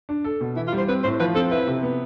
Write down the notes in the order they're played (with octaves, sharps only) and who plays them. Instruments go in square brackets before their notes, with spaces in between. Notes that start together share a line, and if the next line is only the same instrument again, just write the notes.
[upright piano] D4
A4
B2
[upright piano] E3 [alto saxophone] E4
[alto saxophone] F4
[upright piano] G3
[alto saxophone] C5
[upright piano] C4 [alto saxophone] B4
[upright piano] A2 [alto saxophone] C5
[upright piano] F3 [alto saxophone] B4
[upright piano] C4 [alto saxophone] A4
[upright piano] E4 [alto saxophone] B4
[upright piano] C3
B3